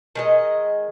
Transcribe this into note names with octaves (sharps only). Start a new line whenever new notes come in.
D#3 G#3 D#5